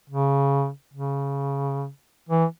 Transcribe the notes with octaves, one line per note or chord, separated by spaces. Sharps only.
C#3
C#3
E3